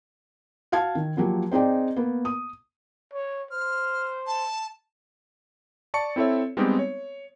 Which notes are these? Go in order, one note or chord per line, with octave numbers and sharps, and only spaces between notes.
F#4 F5 A5 G#6
D#3
F3 F#3 A#3 F#4 G4
C4 D#4 G#4 D5 G5
A#3 B3
D#6
C#5
C5 F6
A5
D5 A5 C#6 C#7
C4 E4 A4 C#5 E5
G3 G#3 B3 C4 D#4 G4
C#5